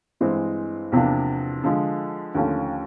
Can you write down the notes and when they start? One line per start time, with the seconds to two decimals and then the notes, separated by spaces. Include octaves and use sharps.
0.20 G2 E3 G#3 C4
0.92 E2 C3 F3 A#3 D4
1.64 D3 F3 G#3
2.35 D#2 D3 F3 A3 C#4